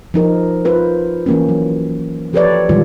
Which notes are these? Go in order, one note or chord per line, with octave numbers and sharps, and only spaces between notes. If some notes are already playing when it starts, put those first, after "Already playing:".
F3 D#4 A#4
F4 B4 C5
E3 A#3 C#4
F#3
F3 G4 A4 B4 C#5 D5
A#2 D#3 E3 G3 G#3 F4